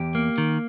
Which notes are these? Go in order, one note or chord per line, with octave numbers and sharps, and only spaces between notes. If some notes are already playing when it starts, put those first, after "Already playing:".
Already playing: E2 G4
A#3
D#3